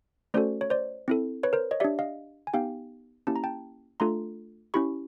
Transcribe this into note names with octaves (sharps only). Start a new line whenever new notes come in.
A3 C#4 F#4 A4 C5 D5
C#5
C5 D5
C4 E4 A4
B4 C#5
A#4 C5
C#5 D#5
D4 G4 D5 E5
D#5 F5
G#5
B3 D#4 G4 F5 G5
A#3 C#4 E4 G4 A5
A#5
G5 A5
A3 D4 F4 A4 A#5 C6
C#4 E4 G4 B5 C#6